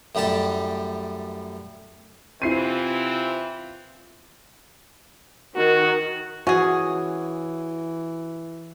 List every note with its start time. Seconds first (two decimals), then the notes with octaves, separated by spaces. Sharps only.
0.15 F#2 A2 G3 G4 A5
2.42 C3 E3 C4 E4 F4 C7 D#7
5.56 D#3 F#4
6.47 E3 C#4 F#4 G#4